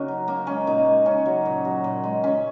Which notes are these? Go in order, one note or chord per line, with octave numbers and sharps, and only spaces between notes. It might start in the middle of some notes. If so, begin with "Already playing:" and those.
Already playing: C#3 A#3 C#4 D#4 F#4 A#4
F#3
C#3 A#3
G#3 C#4
A#2 A#3 D#4
G#3
C#3 C#4
F#3
A#2
F#3
A#2
G#3
A#2 C#4